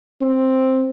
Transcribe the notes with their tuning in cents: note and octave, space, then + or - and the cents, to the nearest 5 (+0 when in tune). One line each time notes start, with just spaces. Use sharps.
C4 +5